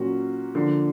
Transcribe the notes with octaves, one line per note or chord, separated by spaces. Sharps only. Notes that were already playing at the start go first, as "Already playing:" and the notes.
Already playing: A#2 F#3 A#3 C#4 F#4
D3 F3 A#3